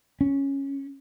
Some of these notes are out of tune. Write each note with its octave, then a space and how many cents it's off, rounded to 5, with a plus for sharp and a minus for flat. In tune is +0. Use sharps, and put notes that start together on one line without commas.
C#4 -5